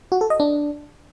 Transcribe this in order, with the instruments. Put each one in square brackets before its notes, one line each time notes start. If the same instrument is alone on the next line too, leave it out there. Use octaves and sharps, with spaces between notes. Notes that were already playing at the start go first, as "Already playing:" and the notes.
[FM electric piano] F#4
A4
D#5
D4